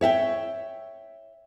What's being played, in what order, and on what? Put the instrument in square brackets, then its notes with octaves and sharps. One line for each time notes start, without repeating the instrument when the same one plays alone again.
[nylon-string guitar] C#5 E5 F#5 G5